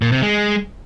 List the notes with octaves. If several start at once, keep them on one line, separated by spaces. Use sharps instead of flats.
A#2
C3
G#3